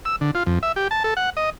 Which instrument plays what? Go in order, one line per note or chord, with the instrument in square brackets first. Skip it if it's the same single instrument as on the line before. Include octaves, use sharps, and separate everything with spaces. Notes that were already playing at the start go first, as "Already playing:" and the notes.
[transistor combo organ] E6
D3
F4
F2
E5
G4
A5
A4
F#5
D#5